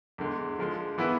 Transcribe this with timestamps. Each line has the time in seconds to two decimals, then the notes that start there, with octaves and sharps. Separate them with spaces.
0.18 E2 D3 G#3
0.58 D3 F3 G#3
0.98 E3 B3 E4 B4